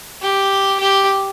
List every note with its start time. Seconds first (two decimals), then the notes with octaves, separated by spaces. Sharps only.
0.22 G4
0.80 G4